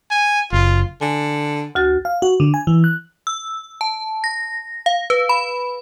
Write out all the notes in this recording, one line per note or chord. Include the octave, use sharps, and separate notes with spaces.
G#5
F#1 F4
D3 G#5
D2 F#4 A6
F5
F#4
D3
G#5
E3
F#6
E6
A5
A#6
F5
B4
B5